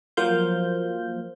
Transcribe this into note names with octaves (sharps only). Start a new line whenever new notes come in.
F3 F#3 A#3 C5 F5 G6